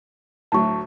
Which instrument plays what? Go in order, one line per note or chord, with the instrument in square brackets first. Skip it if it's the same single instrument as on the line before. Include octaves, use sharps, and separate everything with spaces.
[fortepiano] D2 A2 F#3 [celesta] A5 C#6